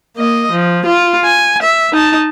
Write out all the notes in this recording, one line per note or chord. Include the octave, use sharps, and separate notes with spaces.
A#3 D#5
F3
F4
G#5
E5
D#4 A5